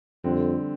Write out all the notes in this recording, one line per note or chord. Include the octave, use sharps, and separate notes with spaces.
F2 D3 G3 C4